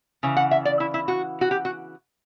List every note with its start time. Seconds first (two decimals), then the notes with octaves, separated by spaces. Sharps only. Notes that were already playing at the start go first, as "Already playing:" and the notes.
0.23 C#3 E3
0.37 F#5
0.51 E5
0.65 D5
0.80 E4
0.94 E4
1.08 F#4
1.41 F#4
1.51 G4
1.65 F#4